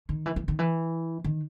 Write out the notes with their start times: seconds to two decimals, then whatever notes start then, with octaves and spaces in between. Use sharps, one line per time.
0.09 D#3
0.26 E3
0.36 E3
0.48 D#3
0.59 E3
1.24 D#3